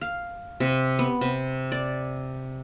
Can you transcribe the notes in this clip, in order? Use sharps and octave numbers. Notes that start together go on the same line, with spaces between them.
F5
C3
B3
C3
D5